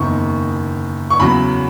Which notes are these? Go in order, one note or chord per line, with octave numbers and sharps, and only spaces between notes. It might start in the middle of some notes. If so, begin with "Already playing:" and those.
Already playing: F#1 E2 D#3 C#6
C#6
E2 C#3 F#3 B5